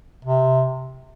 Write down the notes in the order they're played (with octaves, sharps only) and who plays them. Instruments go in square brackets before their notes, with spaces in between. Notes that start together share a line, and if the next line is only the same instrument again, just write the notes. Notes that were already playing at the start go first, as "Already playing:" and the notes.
[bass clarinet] C3